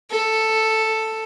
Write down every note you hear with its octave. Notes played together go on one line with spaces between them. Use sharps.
A4